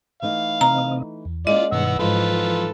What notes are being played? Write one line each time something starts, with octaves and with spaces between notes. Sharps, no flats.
E3 A3 D#4 F5
C3 C4 D#5 A#5
E2
G#3 A#3 C#4 E4 F4 D5 D#5
G2 B2 D#3 B3 F#5 E6
G#2 E3 F3 F4 A4 B4